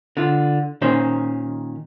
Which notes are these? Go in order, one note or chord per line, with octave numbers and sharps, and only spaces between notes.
D3 F4
A#2 D#3 C#4 C5